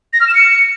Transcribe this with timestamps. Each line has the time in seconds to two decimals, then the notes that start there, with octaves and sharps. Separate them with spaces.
0.13 A#6
0.20 F6
0.28 E7
0.35 C#7